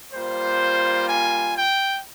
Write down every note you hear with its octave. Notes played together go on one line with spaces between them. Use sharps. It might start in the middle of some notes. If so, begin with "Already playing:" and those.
G3 A#3 F4 C5
G#5
G5